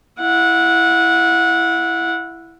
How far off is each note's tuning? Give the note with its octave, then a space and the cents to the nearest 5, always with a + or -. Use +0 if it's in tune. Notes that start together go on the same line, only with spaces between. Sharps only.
E4 +15 F#5 -20